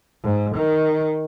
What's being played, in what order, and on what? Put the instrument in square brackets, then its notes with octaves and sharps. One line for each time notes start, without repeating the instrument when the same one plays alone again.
[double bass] G#2
D#3